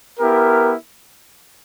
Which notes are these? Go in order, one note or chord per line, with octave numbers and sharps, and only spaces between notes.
B3 E4 G4 A#4